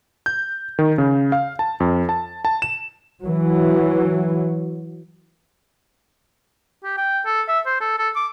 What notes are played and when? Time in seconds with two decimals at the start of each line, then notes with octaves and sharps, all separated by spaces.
0.26 G6
0.79 D#3
0.98 C#3
1.32 F5
1.59 A5
1.80 F2
2.09 A5
2.45 A5
2.62 E7
3.24 E3 F#3
6.84 G4
6.97 G5
7.26 A4
7.48 E5
7.66 C5
7.80 A4
7.99 A4
8.16 D6